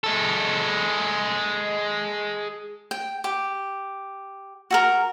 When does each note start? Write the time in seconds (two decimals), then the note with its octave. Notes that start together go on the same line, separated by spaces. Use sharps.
0.04 G#3 A4
2.91 G5
3.24 G4
4.71 F#4 A4 A#4